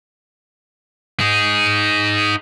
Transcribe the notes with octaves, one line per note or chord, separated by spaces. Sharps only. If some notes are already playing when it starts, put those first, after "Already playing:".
D#4 G#4